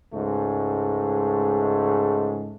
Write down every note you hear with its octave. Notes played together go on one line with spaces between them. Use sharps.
C#2 G#2 G#3 A3